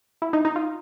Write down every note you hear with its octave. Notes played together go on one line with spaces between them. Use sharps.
E4
D#4
D#4
F4